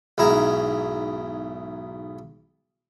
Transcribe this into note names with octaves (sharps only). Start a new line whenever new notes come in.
B1 G#2 E4 G#4 A#5